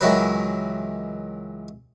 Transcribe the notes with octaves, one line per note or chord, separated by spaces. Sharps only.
C#2 D#3 E3 F#3 B4